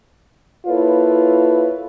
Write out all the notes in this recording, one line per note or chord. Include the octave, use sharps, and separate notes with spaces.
A#3 E4 F4 A4 B4 C#5